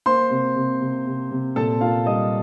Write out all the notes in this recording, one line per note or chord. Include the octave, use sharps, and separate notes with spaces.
A#3 C5 C6
C3
C3
C3
C3
C3
A#2 A4 A5
A#3 F4 F5
G3 D#5 D#6